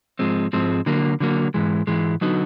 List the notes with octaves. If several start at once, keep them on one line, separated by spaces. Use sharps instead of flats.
G#2 F3 G#3 C4
G#2 F3 G#3 C4
D3 F#3 A#3
D3 F#3 A#3
G#2 E3 G#3
G#2 E3 G#3
D3 F#3 B3 D#4 F#4